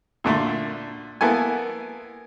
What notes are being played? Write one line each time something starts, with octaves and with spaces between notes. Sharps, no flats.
A#2 D3 A3
A#3 B3 E4 A4 G#5